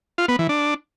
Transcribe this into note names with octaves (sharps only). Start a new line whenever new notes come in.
F4
B3
E3
D4